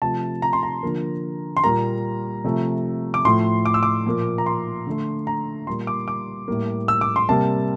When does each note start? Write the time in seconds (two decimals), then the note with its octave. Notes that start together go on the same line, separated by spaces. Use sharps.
0.02 C3 F3 A3 A5
0.42 A#5
0.53 C6
0.63 A#5
0.83 D3 F3 A#3
1.57 C6
1.64 A#2 G3 A#3 A#5
2.44 C3 F3 A3
3.14 D6
3.25 A2 F3 A3 C6
3.65 D6
3.74 E6
3.83 D6
4.06 A#2 F3 A#3
4.38 A#5
4.46 C6
4.86 D3 A3
5.27 A#5
5.67 A#2 G3 A#3 C6
5.87 D6
6.08 D6
6.48 A2 G3 A#3
6.88 E6
7.01 D6
7.16 C6
7.29 C3 G3 A#3 A5